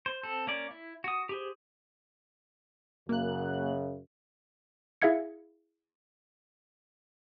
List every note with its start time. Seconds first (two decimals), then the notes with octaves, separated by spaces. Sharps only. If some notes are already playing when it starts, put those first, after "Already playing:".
0.06 C5
0.23 C4 A4
0.47 A#3 C#4 D5
0.71 E4
1.04 F#4 D#6
1.29 G4 G#4 C5
3.09 F#2 C#3 A#3 F#6
5.02 E4 G#4 E5 F5 G#6 C#7